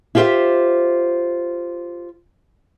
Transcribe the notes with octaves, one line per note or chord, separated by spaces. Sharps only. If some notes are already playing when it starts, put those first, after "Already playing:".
E4 F4 G4 A4 C5 E5